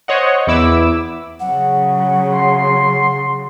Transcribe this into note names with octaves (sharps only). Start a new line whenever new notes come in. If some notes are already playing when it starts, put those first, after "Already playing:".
C5 C#5 D#5 F#5
E2 B3 E4 D6 E6
C#3 F#3 F#5
C6